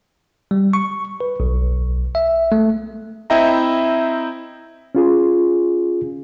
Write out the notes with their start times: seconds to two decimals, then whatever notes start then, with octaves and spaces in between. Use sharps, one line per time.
0.51 G3
0.73 C#6
1.20 B4
1.40 B1
2.15 E5
2.52 A3
3.30 C4 E4 D#5 E5 G5 A#5
4.95 C#4 F4 G#4